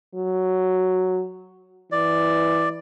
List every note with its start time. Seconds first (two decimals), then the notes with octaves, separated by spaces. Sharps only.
0.15 F#3
1.92 E3 D5